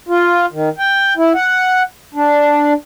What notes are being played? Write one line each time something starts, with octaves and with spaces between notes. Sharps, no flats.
F4
D#3
G5
E4
F#5
D4